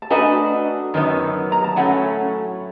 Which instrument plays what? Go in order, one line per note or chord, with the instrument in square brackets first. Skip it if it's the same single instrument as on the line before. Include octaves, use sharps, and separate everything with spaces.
[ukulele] A5
[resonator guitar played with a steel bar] A3 D4 F#4 B4 D#5 [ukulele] G#5 A#5
[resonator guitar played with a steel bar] F#2 D#3 F#3 B3
[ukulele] A#5
A5
[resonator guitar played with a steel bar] A2 F#3 A3 C#4 [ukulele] F#5 G#5